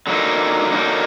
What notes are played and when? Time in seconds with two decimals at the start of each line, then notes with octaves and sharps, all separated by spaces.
0.07 D3 F#3 A#3 D#4
0.71 D3 F#3 A#3 D#4